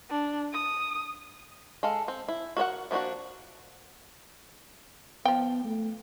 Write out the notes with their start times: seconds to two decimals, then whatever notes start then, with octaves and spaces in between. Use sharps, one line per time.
0.10 D4
0.53 D#6
1.83 G#3 A4 F5
2.08 C4
2.28 E4
2.57 F#4 A#4 C#5 F#5
2.91 F3 A#3 B3 D4 F#4
5.25 F3 B3 G5
5.64 A3